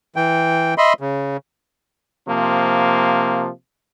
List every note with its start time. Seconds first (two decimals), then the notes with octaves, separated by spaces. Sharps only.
0.16 E3 G5
0.78 D#5 E5 B5 C6
1.01 C#3
2.27 C3 F3 A#3